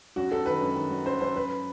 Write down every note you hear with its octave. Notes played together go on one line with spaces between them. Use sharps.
F#2 F#4
F#2 A4
D#3 B4
F#2
D#3
F#3
F#2 C5
F#2 C5
F#2 B4